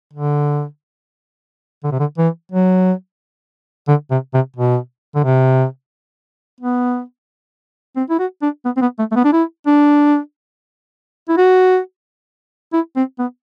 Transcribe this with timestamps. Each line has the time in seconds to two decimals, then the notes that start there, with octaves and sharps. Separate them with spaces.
0.13 D3
1.84 D3
1.92 C3
1.99 D3
2.18 E3
2.52 F#3
3.88 D3
4.11 C3
4.33 C3
4.56 B2
5.15 D3
5.24 C3
6.61 B3
7.96 C4
8.10 E4
8.19 F#4
8.42 D4
8.65 B3
8.77 C4
8.82 B3
8.99 A3
9.12 A3
9.16 B3
9.24 D4
9.33 E4
9.67 D4
11.29 E4
11.37 F#4
12.73 E4
12.96 C4
13.19 B3